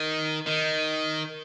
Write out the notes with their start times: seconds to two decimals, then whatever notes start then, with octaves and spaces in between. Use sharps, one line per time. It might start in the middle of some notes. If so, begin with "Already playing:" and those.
Already playing: D#3
0.47 D#3